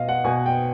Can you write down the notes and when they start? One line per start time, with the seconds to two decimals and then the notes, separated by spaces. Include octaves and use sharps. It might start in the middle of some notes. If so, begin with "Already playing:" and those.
Already playing: B2 D#5 F5
0.09 F#5
0.24 B2 G#5
0.46 G5